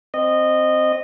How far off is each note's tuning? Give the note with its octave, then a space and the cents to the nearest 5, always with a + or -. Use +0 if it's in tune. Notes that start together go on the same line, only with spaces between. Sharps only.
C4 +0 D#5 -15